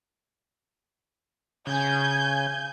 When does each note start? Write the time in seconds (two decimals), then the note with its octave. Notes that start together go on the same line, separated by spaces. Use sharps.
1.67 C#3 G#5 G6 G#6